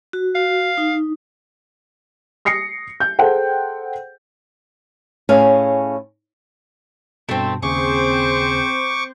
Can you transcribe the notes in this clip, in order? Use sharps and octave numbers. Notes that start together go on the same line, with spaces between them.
F#4
F5
D#4
D#6 A#6 C7 C#7
G6
G#4 A4 C5 F#5 G5
A2 C#4 G#4 F5 G#5
G2 B2 A3 C4
D#2 C#3 C4 G#4 C5 C#6 D6